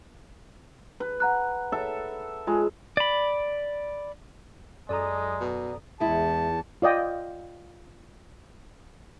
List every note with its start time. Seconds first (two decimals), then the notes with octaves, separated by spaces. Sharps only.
1.00 B4
1.20 F#5 A#5 F#6
1.72 A4 E5
2.47 G#3 F4 G#5
2.97 D5 B5
4.89 F#2 G#3 A4 D5 A#5 D#6
5.40 B2
6.00 E2 G#3 E4 A5
6.82 F4 D5 D#5 G5